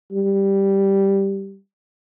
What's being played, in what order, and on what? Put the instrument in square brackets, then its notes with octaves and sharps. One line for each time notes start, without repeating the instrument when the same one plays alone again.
[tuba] G3